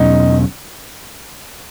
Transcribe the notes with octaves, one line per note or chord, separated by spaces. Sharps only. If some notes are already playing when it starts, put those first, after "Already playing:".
Already playing: E2 B2 F#3 C#4 D#4